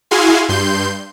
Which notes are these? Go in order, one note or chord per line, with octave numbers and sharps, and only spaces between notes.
E4 F#4 G#4 F5 G#5 C6
G2 C6 G6